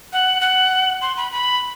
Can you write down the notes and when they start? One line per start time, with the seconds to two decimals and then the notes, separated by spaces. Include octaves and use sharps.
0.13 F#5
0.41 F#5
1.02 C6
1.17 B5
1.32 B5